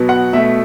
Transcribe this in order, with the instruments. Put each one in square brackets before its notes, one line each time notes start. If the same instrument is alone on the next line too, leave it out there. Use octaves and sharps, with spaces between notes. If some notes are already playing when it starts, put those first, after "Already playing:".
Already playing: [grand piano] B2 F#3 B3
F#5
B2 A3 E5